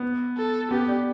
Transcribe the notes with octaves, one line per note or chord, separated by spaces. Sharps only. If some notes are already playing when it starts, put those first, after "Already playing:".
Already playing: B3
A4
B3 G4
D4